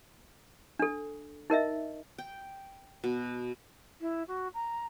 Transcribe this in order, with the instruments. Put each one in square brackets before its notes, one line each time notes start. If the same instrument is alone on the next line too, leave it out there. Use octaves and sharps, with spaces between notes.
[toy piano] D4 A4
D#4 A#4 D#5 E5
[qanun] G5
B2
[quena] E4
F#4
A#5